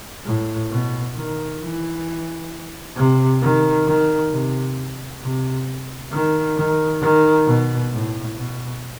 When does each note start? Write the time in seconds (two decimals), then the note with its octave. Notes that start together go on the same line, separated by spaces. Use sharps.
0.25 A2
0.70 B2
1.15 D#3
1.60 E3
2.96 C3
3.41 D#3
3.86 D#3
4.31 C3
5.22 C3
6.12 D#3
6.57 D#3
7.01 D#3
7.46 B2
7.92 A2
8.37 B2